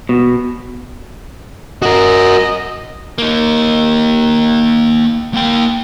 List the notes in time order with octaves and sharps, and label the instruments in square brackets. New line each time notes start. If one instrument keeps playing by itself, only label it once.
[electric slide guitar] B2
[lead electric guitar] F#4 A#4 [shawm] D#5
[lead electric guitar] A#3 D#4
A#3 G5